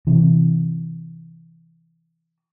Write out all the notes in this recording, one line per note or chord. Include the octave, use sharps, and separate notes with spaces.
C3 E3